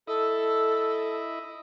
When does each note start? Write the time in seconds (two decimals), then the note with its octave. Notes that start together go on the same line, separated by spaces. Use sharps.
0.07 E4 A4 D#5